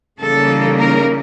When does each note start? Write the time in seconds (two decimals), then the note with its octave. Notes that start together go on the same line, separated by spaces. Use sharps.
0.20 C#3 E3 G3 A#3 D#4 A4
0.80 A#4